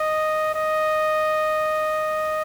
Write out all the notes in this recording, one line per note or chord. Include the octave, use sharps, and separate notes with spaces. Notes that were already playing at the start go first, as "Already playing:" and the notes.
Already playing: D#5
D#5